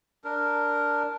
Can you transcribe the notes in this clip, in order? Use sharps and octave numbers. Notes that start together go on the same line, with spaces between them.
D4 A#4